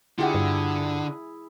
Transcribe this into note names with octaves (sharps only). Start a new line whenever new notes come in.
D3 E4 F4 G4 G#4 F#5
G2